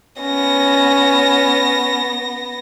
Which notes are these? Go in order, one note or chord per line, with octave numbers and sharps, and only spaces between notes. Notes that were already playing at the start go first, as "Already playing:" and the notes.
B3 C#4 A#6